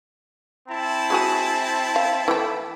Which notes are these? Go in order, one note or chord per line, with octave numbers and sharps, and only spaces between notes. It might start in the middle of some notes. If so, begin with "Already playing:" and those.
C4 E4 A5
G#3 F#4 G#4
F5
E3 A3 G5